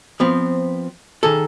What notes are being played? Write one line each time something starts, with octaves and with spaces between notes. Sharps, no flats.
F3 B3 C4
D#3 G#4 A4